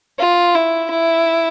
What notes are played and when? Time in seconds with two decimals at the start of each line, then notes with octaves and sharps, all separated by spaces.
0.19 F4
0.55 E4
0.90 E4